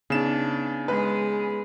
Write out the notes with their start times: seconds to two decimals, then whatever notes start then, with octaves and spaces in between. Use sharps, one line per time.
0.10 C#3 B3 D4 D#4 E7
0.88 G#3 G#4 B4